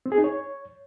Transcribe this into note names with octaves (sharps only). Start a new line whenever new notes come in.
C4
G#4
D#4
C#5